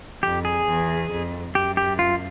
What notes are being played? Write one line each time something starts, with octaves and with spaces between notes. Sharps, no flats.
F2 G4
G#4
E2
F2
F#2 G4
G4
F4